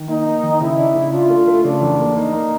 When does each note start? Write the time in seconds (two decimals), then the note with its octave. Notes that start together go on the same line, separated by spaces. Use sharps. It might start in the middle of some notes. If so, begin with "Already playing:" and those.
Already playing: D#3
0.08 A#3 D#4
0.26 A#3
0.43 D#3
0.60 C#3 E4
0.78 D4
0.95 C#3
1.12 D4 F4
1.30 A3
1.48 A3
1.64 C#3 D4
1.81 E2
1.99 A#3
2.16 A#3 D#4
2.33 A#3